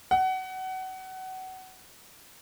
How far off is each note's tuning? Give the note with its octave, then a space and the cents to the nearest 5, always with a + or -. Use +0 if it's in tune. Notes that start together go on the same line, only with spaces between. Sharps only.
F#5 +25